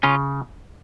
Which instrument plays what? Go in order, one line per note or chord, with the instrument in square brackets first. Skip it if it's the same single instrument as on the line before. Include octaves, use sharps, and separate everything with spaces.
[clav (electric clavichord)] C#3 [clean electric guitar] C#4 F4